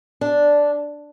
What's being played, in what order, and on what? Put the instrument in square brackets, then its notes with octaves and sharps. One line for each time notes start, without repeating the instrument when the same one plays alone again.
[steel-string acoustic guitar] D4